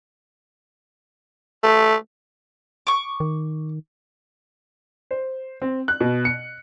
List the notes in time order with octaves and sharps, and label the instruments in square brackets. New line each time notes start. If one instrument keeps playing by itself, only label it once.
[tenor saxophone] A3
[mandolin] C#6 D6
[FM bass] D#3
[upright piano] C5
C4
F#6
B2
C#7